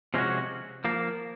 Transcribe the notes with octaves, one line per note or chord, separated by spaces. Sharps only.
C3 F3 G#3 C#4 F#4
F3 A#3